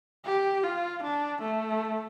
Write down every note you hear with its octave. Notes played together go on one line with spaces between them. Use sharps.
G4
F4
D4
A3